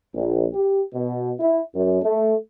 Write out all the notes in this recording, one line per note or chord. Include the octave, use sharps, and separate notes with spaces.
A#1
G4
B2
E4
F#2
A3